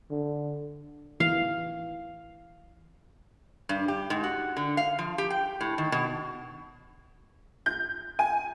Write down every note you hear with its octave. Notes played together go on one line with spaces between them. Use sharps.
D3
E3 F5
G2
G4
G#2
F#4
D3
F5
F3
G4
G5
A2
D#3
B2
G6
G#5